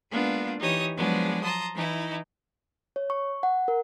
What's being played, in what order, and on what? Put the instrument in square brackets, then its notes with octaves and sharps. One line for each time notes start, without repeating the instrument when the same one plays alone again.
[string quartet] G#3 A#3 B3 D4 F4
E3 D#4 G4 C#5 D#6
F3 F#3 G#3 B3 D4 G#4
A5 A#5 C6 D#6
E3 D#4 E4
[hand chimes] C#5
C#6
F#5
A#4